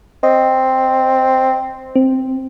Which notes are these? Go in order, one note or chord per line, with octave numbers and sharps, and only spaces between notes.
C4 D#5
C4